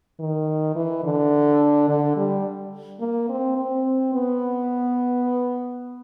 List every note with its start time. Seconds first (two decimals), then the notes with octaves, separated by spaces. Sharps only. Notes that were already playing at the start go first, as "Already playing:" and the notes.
0.20 D#3
0.75 E3
1.04 D3
1.88 D3
2.16 G3
3.00 A#3
3.29 C4
3.56 C4
4.14 B3